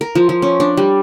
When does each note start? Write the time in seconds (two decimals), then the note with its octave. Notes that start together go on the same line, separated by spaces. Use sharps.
0.01 A#4
0.15 F3
0.29 F3
0.42 C#4
0.60 D4
0.77 G3